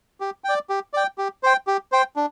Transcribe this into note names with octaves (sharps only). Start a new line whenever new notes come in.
G4
D5 G5
G4
D5 G5
G4
C5 G5
G4
C5 G5
D4